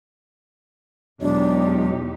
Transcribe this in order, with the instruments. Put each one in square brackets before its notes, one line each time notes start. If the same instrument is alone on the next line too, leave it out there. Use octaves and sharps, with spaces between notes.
[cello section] E2 D#4 G4 [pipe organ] B2 F#3 G#3 [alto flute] D4